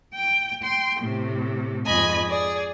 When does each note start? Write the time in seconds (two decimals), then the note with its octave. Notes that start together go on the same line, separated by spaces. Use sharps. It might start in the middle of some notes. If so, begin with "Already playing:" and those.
0.15 G5
0.63 G5 C6
0.99 A2 C3
1.86 F2 G#2 D#5 G#5 B5 G#6
2.27 G#4 D5